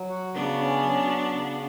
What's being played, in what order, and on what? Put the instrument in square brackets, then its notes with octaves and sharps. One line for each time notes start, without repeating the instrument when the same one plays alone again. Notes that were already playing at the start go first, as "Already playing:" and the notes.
Already playing: [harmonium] F#3
F#4
[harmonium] C#3 [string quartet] B3 D4
[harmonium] C#4
F#3
F#4
C#3